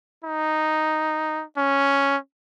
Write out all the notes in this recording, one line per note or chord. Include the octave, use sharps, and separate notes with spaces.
D#4
C#4